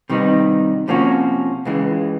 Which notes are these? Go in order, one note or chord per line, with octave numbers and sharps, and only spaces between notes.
C3 D#3 G3 B3 D#4
C3 F3 A#3 C#4 F#4
C#2 C#3 E3 G#3